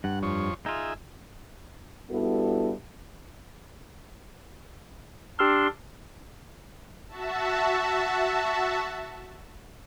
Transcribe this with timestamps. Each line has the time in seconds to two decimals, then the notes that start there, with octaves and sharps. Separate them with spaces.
0.04 G2 F#5
0.23 F2 C#5
0.66 D#4 F4 G#4 E5
2.10 G2 G3 B3 E4 F#4 A4
5.39 D4 G4 C6 E6 F6
7.08 F#4 E5 A5